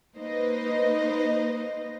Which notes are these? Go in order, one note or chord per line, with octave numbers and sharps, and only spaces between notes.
A#3 D#4 B4 C5 D#5